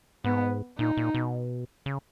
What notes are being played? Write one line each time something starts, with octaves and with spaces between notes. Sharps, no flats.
G#2 B3
A#2 D#4
A#2
B2
C#3